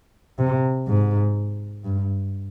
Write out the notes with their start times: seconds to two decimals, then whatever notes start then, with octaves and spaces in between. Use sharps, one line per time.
0.38 C3
0.87 G#2
1.85 G2